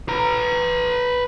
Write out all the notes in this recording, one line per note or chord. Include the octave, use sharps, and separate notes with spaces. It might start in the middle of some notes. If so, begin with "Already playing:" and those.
B4 A#5